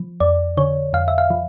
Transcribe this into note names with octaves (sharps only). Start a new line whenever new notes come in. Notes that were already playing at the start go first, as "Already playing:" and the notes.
Already playing: F3
F2 D5
D3 C#5
F2 F5
E5
F5
F3